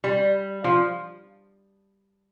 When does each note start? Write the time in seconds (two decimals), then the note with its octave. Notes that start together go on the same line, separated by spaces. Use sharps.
0.04 G3
0.64 F3